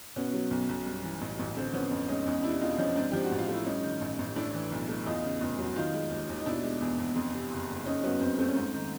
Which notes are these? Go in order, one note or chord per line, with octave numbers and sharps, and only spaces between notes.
B2 B3 C#4
F#3
B1
B1
G2
E3
A1
A1
D3 C4
F3 B3 C#4
F2
G#3 C#4 D#4
E2 C#4 D#4
C3 D4 E4
E1 D#4 F4
F3 C#4 D#4
G#2 C4 D4
F3 G4
F#4
A1
F4
A3 E4
G2 C#4 D#4
D#3
A1
A1
A2 D4 E4
E3
B1
A3
E2 D#4 F4
C#3
F1
F#3
D#3 D#4 F4
G#3
D#2
D#2
D#4
B2 D4 E4
G#3
E2
E2
F2
C3
F#1
F#1
C#3 C#4 D#4
F#3 B3 C#4
F2 C4
A3 C4
C#4
G#2 C4
D#3